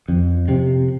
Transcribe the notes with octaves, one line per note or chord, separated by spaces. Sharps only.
F2
C3